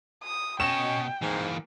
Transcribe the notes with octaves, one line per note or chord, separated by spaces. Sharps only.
D#6
B2 C#4 D#5 G5 E7
G#2 E3 A#3